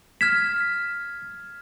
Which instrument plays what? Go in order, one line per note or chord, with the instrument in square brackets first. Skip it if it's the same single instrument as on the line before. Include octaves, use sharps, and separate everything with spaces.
[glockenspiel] F6 G#6 E7 [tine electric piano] B6